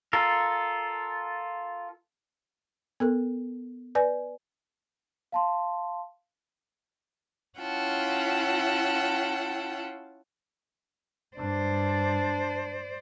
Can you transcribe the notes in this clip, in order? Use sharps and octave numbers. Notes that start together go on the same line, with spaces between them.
F4 A4 A#4
B3 A4 A#4
B4 D5 G#5
F5 A5 C6
C#4 E4 F4 F#5 G5 A5
G2 D4 C5 D5